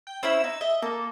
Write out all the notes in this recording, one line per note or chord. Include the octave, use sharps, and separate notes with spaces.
G5
C4 C#4 E4 E6
D#4
D#5 E5
A#3 A4